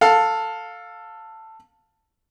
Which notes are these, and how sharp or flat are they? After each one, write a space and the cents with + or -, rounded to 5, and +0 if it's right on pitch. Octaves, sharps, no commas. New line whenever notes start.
A4 +10 F5 +15